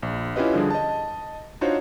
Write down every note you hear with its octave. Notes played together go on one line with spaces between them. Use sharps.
A#1
C#4 E4 F4 G4 B4 D#5
D3 F3 G3 D4 G#4
D#5 A5
D4 D#4 F4 F#4 C5 C#5